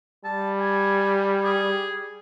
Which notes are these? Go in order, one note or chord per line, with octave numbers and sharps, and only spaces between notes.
G3 A5
G#5
G#4